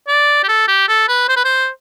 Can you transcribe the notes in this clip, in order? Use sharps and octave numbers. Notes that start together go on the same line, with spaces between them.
D5
G4
A4
G4
A4
B4
C5
B4
C5